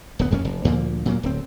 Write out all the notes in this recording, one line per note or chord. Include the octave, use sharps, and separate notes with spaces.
D1 B3
D#1 F2 A#3 C#4
F1
D2 A#2 F3 A#3
A#2 F#3 A#3
D1 C4